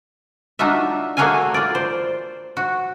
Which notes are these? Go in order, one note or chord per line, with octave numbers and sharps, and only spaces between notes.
D4 D#4 F4 F#4 E5
A3 A#3 F#4 G#4 F5 G#5
F4 D5
C5
F#4